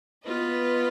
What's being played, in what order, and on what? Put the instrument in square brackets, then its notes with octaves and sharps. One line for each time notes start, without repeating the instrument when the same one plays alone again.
[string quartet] B3 F4 B4 D#5